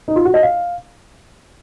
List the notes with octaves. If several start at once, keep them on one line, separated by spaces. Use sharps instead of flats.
D#4
F4
F#4
D#5
F5